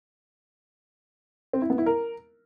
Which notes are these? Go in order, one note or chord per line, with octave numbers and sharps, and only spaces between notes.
C4
E4
B3
E4
A#4